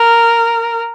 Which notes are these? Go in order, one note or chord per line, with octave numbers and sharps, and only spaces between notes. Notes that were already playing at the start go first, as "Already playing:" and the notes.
Already playing: A#4